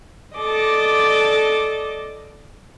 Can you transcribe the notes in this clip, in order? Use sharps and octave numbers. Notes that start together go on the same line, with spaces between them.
A4 D5 D#5 D6